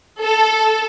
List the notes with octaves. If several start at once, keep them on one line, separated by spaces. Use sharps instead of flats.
A4